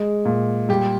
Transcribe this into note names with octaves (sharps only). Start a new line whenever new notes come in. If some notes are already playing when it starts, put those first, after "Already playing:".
Already playing: G#3
A#2
G3 G4